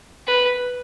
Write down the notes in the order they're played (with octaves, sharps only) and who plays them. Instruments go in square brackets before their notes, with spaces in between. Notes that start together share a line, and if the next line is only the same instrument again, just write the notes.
[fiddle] B4